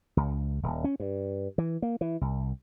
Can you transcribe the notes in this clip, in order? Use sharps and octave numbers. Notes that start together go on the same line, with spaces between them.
C#2
D#1
C#4
G2
E3
A#3
E3
C2